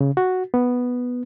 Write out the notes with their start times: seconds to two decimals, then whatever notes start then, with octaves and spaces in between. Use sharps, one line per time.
0.01 C#3
0.17 F#4
0.54 B3